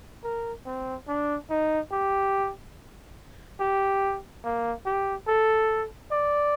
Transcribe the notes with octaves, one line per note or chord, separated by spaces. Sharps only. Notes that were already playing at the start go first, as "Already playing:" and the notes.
A#4
C4
D4
D#4
G4
G4
A#3
G4
A4
D5